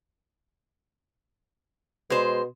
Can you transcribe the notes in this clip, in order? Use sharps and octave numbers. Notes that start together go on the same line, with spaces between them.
B2 G#3 C5